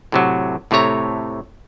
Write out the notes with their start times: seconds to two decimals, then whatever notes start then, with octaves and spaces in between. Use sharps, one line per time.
0.12 A2 C3 F#3
0.71 A2 C3 A3 C#5 A#5